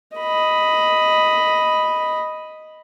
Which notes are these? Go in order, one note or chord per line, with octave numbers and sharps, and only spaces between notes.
D#5 B5